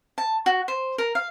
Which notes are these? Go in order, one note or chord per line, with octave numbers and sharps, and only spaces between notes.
A5
F#4
C5
A#4
F5